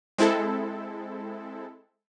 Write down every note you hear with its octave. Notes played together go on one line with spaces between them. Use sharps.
G#3 C4 E4 A4